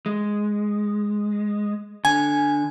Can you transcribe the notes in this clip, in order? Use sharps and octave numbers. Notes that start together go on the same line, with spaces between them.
G#3
D3 G#5